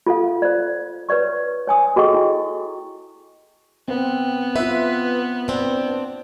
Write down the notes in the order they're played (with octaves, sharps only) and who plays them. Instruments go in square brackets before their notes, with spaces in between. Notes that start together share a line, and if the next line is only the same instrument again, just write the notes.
[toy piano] F4 A4 F5
C5 D5
B4 C#5 D5 C#6
C#5 G#5 D#6
F#4 G#4 A4 D#5 G5 C#6
E4
[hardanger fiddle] B3 [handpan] C4
[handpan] F4 E5 [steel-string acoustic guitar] B4
[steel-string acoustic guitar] C4 D4